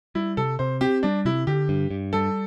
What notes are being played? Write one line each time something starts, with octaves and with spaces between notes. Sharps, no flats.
G3 E4
C3 A4
C3 C5
C4 G4
G3 D4
C3 E4
D3 G4
G2
G2
G3 A4